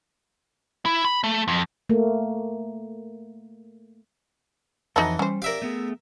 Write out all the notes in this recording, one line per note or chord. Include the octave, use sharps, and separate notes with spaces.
E4
B5
A3
F2
A3 A#3
F2 E3 D#4 F#4 A4 C#5 D#5
G3 C#4 C5
G4 A#4 D5 E5 F5
A3 B3 G#4